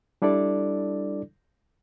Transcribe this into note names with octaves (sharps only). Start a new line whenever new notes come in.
G3 D4 E4 A4 D5